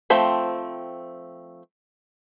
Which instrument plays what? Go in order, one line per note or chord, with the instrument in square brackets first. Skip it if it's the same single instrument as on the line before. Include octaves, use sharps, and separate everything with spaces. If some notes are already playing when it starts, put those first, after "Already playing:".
[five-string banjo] F3 A3 C4 B5